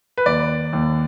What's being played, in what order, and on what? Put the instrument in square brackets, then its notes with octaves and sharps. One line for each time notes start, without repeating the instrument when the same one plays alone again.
[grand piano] B4
D#2 D5
D#2